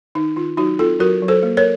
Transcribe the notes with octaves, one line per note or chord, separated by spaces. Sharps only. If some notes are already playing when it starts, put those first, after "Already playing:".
D#3 D#4
D#3 F4
F#3 D#4 F#4
C4 F4 A4
F#3 F#4 A#4
F#3
A4 C5
A#3
A#4 C#5